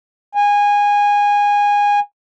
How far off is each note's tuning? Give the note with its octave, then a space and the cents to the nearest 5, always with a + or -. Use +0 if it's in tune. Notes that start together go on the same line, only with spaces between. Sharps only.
G#5 -20